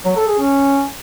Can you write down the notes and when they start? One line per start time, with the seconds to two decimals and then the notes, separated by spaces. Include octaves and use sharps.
0.05 F#3
0.16 A4
0.28 G#4
0.39 C#4